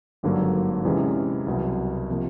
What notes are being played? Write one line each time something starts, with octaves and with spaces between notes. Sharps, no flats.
G#1 G2 D3 F#3 A#3
E2 C3 E3 G#3 C#4
C2 B2 F#3
C3 F3 A#3